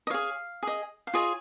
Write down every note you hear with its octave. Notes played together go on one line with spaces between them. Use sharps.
D#5
G#4 C#5 F5
G#4 D#5
F5
F4 G#4 C#5 D#5